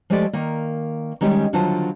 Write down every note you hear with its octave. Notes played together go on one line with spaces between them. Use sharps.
F3 G#3 A3 G4 A4 D5
D#3 A#3
D#3 G3 G#3 C#4 G4
D3 D#3 F#3 F4 C5 A5